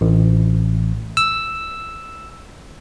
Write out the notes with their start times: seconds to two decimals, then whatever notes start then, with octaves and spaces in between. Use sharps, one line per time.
0.01 A1
1.17 E6